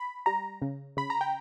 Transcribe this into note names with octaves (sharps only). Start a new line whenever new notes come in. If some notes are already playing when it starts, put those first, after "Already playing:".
Already playing: B5
G3 A#5
C#3
C#3 B5
A#5
G5